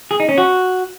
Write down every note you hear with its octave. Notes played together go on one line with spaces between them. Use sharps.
G#4
D#4
C#4
F#4